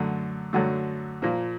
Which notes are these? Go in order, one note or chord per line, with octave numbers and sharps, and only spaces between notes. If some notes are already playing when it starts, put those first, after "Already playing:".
Already playing: F#2 D3 F#3 A3
F#2 D3 F#3 A3
A#2 F3 A#3